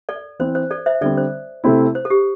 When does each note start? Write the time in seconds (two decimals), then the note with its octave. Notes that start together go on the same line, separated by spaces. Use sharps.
0.09 A4 D5
0.39 E3 C4 E4 C5
0.55 C5
0.71 A4 D5
0.86 C5 E5
1.01 D3 G3 C4 A4 D5
1.17 C5
1.64 C3 A3 C4 E4
1.95 C5
2.05 A4
2.10 G4